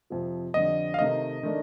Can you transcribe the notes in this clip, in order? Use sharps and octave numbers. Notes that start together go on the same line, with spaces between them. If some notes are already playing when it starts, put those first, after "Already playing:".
F2 C3 F3
F2 D3 G3 D#5
F5
C3 D#3 A3 D#4 D#5
D#3 A3 D4